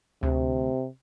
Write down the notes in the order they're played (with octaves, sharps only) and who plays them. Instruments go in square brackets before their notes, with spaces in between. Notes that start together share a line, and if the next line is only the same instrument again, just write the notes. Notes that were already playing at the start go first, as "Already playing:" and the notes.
[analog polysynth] D2 [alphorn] C3